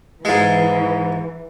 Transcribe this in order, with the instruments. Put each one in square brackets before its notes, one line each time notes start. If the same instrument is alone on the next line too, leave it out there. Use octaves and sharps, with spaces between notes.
[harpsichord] G#2 G#3 [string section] E3